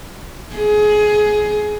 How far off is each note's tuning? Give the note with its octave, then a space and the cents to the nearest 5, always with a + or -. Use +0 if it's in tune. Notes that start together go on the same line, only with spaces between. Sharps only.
G#4 +20